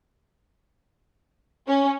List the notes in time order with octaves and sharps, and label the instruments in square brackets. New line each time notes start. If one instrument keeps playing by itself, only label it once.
[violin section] C#4